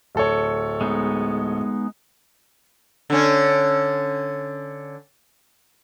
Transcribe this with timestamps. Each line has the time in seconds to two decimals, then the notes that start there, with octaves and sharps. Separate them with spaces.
0.15 D1 A4 C#5
0.81 G#3 B3 D#4
3.10 D3 C#4